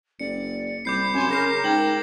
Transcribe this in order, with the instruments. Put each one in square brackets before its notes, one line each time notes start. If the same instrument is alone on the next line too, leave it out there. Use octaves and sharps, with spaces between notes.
[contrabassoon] F#1 [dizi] D5 [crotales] C#7
[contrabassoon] C2 [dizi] B5 [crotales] D6 G6 C7
[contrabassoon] F#2 [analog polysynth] G#5 C6 [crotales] D6 E7
[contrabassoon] C#3 [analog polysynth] A#4 [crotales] G6 A#6 C7
[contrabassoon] G#2 [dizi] G5 [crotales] G#6 F#7 G7